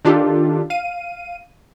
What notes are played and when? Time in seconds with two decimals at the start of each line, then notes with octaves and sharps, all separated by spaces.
0.05 D#3 D4 F4 G4 A4
0.70 F5 D#7